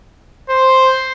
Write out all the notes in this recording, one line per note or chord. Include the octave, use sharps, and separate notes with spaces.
C5